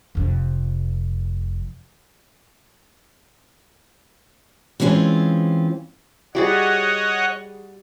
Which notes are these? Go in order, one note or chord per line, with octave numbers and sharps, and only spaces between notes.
F1 F2
E3 G#3 C4 C#4 F4
G3 F#4 G#4 C#5 D#5 F#5